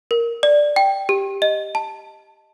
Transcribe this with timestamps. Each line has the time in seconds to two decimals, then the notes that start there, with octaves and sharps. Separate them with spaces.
0.11 A#4
0.43 D5
0.76 G5
1.09 G4
1.42 D#5
1.75 A5